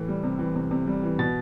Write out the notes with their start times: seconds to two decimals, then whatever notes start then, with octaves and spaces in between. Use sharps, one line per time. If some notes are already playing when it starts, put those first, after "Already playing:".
Already playing: A2 E3
0.08 G3
0.23 C3
0.39 E3
0.55 C3
0.71 C3
0.87 G3
1.03 E3
1.19 B2 A6